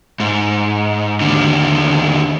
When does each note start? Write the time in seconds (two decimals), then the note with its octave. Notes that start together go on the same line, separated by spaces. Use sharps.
0.20 G#2
1.21 D#2 D3